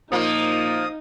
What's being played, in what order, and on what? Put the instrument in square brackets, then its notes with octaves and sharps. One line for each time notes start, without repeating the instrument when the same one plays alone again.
[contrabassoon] A#2 [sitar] F3 A#3 [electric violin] D#4 [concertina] D#6